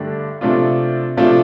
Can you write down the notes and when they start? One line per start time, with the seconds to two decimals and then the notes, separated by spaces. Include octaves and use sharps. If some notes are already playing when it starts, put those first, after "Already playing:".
Already playing: G2 D3 A3 D4 G4
0.41 C3 F3 A3 D4 F4
1.17 C3 F3 A3 D4 F4